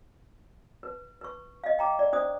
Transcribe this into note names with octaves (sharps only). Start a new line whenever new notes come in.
B4
B4 C#6
D#5 F5
G5 A#5 D6
D5
D4 C5 D5 D#6